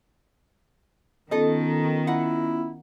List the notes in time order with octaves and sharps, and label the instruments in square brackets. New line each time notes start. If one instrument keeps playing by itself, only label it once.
[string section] D#3 [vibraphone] B3 C#4 F4 [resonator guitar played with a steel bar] A4 D#5
[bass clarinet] E4 [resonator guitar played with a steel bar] F#5